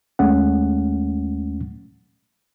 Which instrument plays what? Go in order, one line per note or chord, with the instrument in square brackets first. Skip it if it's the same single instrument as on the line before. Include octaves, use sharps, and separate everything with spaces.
[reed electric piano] D#2 G#3 A3 C#4 F#5